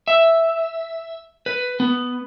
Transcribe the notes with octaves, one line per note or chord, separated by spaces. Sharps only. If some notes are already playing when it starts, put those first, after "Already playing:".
E5
B4
B3